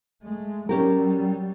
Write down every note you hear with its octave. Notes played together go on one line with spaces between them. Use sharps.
G#3 A3
F#3 G3 C#4 G4 A#4